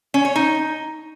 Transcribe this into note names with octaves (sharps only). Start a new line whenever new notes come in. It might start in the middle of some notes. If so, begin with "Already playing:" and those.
C#4
C#5
D#4